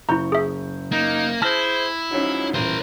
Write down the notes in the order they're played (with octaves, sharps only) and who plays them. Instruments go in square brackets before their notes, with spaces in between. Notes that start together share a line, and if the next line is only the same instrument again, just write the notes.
[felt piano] F#1 C#6 G6 [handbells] E4 A#5
[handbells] G#4 E5
[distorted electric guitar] A#3 [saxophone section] D#4
[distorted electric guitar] E4 [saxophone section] G#4 C5 [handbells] A5 F6 A#6
[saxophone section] G#2 F3 F#3 [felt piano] C#4 D#4
[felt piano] D#1 A1 D#7 [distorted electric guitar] A#4 C5